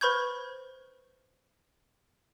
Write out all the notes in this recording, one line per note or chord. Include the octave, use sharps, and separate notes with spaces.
B4 C5 B5 C#6 G6 G#6